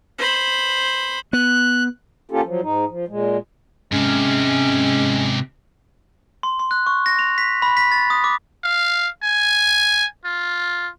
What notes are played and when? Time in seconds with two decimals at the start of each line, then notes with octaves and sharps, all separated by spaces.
0.18 C5 B5
1.33 B3 F#6
2.31 A#3 C#4 F4 G4 A4
2.45 F3 F#3
2.62 G#2 D#4
2.88 F3
3.08 A#2 G#3
3.92 G#2 C3 G#3 C#4
6.43 C6
6.59 C6
6.71 F#6
6.87 C#6
7.06 A#6
7.19 F7
7.38 B6
7.62 B5
7.77 B6
7.92 A6
8.10 D#6
8.24 D6
8.64 F5
9.24 G#5
10.25 F4